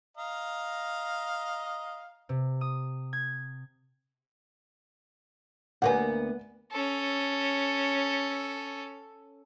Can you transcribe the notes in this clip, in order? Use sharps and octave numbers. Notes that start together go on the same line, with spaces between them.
D#5 F5 A#5
C3
D#6
G#6
D2 A#3 B3 F#5 G#5
C#4 A4